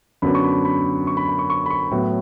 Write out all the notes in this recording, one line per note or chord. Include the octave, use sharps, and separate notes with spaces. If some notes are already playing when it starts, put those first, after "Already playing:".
F#2 D3 F#3 B3 D4 B5
C#6
B5
B5
C#6
B5
B5
C#6
C#6
B5
C#6
A2 F#3 B3